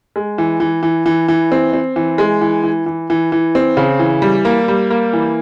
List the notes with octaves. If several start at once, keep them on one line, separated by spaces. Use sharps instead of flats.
G#3
E3
E3
E3
E3
E3
C4
C4
E3
G#3
E3
E3
E3
E3
E3
C4
C#3
E3
G3
A#3
G3
A#3
E3